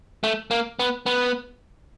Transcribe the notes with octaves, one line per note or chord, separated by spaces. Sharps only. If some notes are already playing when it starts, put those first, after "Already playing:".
A3
A#3
B3
B3